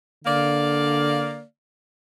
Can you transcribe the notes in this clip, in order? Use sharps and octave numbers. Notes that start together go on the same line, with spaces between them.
D3 A#3 D5 F5